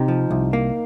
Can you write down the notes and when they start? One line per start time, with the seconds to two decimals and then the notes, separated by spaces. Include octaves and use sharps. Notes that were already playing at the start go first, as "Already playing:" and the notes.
Already playing: C3 D#4 G4
0.08 F3
0.31 C2
0.53 A#3